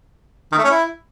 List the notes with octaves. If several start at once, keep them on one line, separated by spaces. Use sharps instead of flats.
D#3
A3
C#4
E4